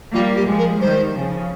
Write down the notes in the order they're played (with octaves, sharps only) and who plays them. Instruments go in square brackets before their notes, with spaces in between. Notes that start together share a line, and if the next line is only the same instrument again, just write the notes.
[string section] G3 A#3 [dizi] F4
[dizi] G4
[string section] F3 G#3
[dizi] A#4
[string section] D#3 G3 [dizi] C5
[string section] C#3 F3